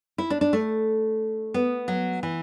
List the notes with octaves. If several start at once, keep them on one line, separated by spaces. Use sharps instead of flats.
E4
D4
D4
A3
B3
F#3
E3